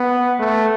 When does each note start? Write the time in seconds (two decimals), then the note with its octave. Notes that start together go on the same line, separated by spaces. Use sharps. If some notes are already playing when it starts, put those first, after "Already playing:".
Already playing: B3
0.39 A3